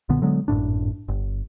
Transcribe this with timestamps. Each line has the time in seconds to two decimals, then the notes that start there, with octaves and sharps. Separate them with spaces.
0.09 B1 A#2 D3 B3
0.22 D3 F#3 G#3 B3
0.48 G#1 F#2 A2 D4
1.08 G1